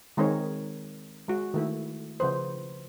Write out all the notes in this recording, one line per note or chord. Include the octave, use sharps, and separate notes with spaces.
D#3 G#3 C4 D#4 A#4 C#5
G#3 F#4
D#3 A3 E4
C#3 F3 B4 C5